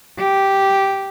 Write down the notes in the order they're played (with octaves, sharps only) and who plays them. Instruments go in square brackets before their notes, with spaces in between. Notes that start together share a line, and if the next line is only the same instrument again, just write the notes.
[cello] G4